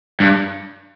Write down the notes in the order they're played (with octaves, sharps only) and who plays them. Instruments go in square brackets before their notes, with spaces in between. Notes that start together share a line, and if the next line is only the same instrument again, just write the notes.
[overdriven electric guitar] G2